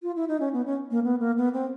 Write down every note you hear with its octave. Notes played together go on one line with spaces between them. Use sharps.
F4
E4
D#4
C#4
B3
C#4
A#3
B3
A#3
B3
C4